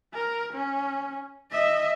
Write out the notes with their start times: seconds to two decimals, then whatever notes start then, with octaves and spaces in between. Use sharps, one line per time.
0.13 A#4
0.53 C#4
1.52 D#5 E5